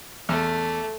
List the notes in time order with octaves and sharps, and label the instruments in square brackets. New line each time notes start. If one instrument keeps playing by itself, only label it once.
[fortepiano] E2 [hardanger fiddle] A3